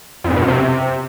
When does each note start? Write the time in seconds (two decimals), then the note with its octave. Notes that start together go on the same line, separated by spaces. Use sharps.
0.24 F2
0.30 G#2
0.36 B2
0.42 F#2
0.48 C3